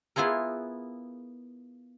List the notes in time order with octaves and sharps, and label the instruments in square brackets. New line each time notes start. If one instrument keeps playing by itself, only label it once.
[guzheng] B3 E4 F4 G#4 A#4